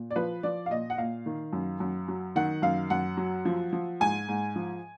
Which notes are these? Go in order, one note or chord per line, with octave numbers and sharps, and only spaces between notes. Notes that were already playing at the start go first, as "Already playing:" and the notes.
Already playing: A#2
D5
F3 B4
F3 D5
F5
A#2 D#5
F#5
A#2 F5
D#3
F#2
F#2
F#3
D#3 F#5
F#2 F5
F#2 F#5
F#3
F3
F3
G#2 G#5
G#2
F3